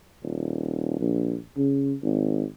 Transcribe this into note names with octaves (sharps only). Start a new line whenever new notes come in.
D#1
A#1
C#3
G#1